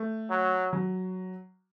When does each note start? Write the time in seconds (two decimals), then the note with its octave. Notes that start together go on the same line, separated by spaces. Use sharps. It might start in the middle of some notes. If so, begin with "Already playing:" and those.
Already playing: A3
0.30 F#3
0.73 F#3